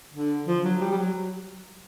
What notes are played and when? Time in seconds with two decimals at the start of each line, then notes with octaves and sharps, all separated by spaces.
0.14 D3
0.47 F3
0.64 F#3
0.81 G3
0.91 G3
0.98 F#3